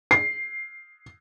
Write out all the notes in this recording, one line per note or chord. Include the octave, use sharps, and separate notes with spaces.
C7